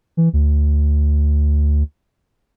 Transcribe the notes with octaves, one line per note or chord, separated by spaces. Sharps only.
E3
D2